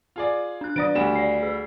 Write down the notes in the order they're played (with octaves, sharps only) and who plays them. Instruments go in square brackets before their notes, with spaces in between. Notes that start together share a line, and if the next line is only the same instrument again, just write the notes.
[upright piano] F4 G#4 D5
[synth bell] D4 F#6
[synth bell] D#3 D4 D5 [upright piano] D#6 A6 D7
[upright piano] D2 G3 E7
[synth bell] D5 C7
G#4